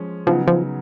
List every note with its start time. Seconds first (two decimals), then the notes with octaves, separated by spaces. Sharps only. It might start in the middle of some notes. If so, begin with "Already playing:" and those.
Already playing: F3 G#3 C#4
0.27 C#3 F3 F#3 B3 D#4
0.47 F3